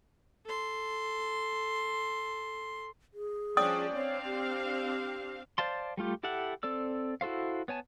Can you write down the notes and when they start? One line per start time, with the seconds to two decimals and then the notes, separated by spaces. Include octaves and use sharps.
0.46 A4 C6
3.14 G#4
3.57 F3 C#4 D4 D5 G5 D#6
3.94 C4 D4 C#5 F5
4.25 G4
5.58 C5 D5 F5 A5 C6
5.97 G3 A3 F4 G4
6.23 E4 G4 A4 E5 F#5
6.63 C4 A4 D5 E6
7.21 E4 F#4 A4 C5 F5
7.68 B3 C#5 G#5 A5